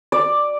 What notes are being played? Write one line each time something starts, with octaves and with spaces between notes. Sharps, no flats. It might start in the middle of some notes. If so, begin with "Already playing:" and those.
D5